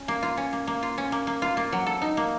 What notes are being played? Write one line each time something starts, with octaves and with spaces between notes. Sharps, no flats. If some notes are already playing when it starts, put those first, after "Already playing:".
Already playing: C#4
A#3
F4
C#4
A#3
A#3
F4
C#4
A#3
A#3
F4
A#3
F#3
A4
D#4
A#3